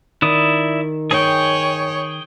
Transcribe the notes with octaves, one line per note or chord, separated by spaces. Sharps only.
D#3 E4 D5 D#6
G#4 C#5 G5